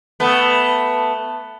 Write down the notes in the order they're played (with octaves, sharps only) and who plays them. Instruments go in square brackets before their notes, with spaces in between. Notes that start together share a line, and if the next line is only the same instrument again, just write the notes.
[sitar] A3 B3